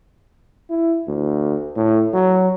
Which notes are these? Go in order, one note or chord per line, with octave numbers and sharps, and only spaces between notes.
E4
D2
A2
F#3